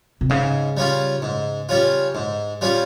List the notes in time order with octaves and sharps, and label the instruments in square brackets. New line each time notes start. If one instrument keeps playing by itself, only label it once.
[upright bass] C3
[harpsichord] G#2 [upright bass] C#3
[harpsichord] G3 C#4 F4
G#2
G3 C#4 F4
G#2
G3 C#4 F4